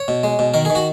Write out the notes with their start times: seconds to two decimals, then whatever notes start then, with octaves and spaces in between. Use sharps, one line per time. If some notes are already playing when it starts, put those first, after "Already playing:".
Already playing: C#5
0.08 B2
0.24 G#3
0.39 B2
0.54 D#3 A#4
0.65 D#3 G#4
0.75 F#4